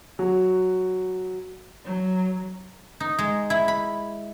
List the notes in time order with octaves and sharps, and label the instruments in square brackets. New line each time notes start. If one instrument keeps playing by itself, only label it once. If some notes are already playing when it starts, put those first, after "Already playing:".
[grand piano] F#3
[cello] F#3
[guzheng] D#4
G#3
E4
B5